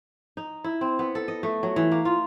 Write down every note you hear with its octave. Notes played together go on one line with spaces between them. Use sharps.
D#4
E4
C4
B3
A4
D#5
A3
F#3
E3
A#3
F4